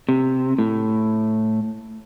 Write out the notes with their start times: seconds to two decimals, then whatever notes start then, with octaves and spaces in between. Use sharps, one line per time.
0.09 C3
0.58 A2